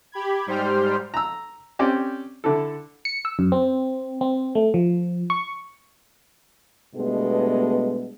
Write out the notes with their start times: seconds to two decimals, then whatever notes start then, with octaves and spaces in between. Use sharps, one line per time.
0.12 G4 B5 G#6
0.46 G#2 G3 C5 G5 F6
1.14 A#5 E6
1.79 C4 C#4 G4 D5
2.44 D3 E4 A4
3.05 C#7
3.25 E6
3.39 F#2
3.52 C4
4.21 C4
4.55 A3
4.74 F3
5.30 C#6
6.95 G2 B2 G#3 A3 B3